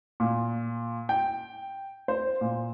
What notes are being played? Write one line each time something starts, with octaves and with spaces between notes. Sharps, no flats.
A#2
G5
C5
A#2